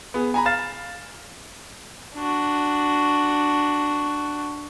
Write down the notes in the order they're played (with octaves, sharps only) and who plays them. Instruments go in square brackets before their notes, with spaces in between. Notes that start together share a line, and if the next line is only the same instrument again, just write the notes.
[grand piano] B3 G#4
G#5 A#5 B5
F5 F6 A6 E7
[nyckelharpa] D4 F#4